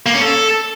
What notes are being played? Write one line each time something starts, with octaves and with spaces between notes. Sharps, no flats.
A#3
C#4
A4